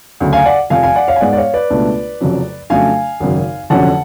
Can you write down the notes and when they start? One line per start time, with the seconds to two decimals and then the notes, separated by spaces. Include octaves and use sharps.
0.20 D2 C#3 F#3
0.33 F5 G#5
0.46 D5 F#5
0.70 F1 F2 F3 F5 G#5
0.83 F5 G#5
0.96 D5 F#5
1.08 C#5 F5
1.16 G#5
1.20 G#2 G#3 B3 D5 F#5
1.33 D5
1.37 C#5 F5
1.54 B4 D5
1.70 C#2 B2 A3 D4
2.21 F1 F2 C#3 F#3
2.70 F2 C#3 F#3 A3 D4 F5 G#5
3.20 G#1 F#2 C#3
3.70 F1 F2 D3 F#3 C#4 F#5 A5